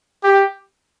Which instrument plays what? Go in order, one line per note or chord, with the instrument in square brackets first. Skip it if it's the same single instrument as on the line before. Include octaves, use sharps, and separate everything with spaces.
[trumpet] G4